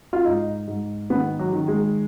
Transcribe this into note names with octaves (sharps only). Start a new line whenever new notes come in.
F4
G#2 D#4
G#2
D#3 B3
F#3
D#3
G#3